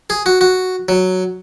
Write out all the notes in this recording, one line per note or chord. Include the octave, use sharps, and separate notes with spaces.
G#4
F#4
F#4
F#3